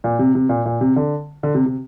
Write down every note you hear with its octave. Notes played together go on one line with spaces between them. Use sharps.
A#2
C3
C3
A#2
A#2
C3
D3
D3
C3
C3